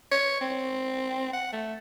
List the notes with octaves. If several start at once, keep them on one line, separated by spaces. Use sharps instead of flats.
C#5
C4
F#5
A3